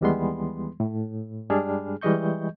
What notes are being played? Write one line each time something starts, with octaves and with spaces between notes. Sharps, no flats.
D#2 E3 G3 G#3 B3 C6
A2
G2 G3 G#3 D4 G#4 F6
E3 G3 G#3 D#5 C#6 G6